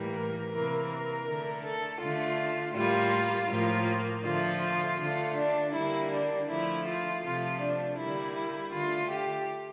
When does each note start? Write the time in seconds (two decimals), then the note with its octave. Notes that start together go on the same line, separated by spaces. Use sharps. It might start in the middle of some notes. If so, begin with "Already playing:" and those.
Already playing: A2 E3 G3 A#3
0.14 A#4
0.51 C3 E3 A#3 A#4
0.89 A#4
1.26 D3 A3
1.64 A4
2.01 D3 A3 F4
2.75 A2 G3 A#3 F4
3.50 A2 F3 A#3 F4
4.25 D3 F3 A3 F4
4.63 F4
4.99 D3 A3 F4
5.37 D4
5.74 D3 G3 A#3 E4
6.11 D4
6.49 D3 F3 A3 E4
6.86 F4
7.24 C3 F3 A3 F4
7.61 D4
7.98 D3 G3 A#3 E4
8.35 E4
8.73 D3 A3 F4
9.10 G4